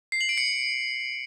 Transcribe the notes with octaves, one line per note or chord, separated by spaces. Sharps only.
C7
F#7
D7
C#7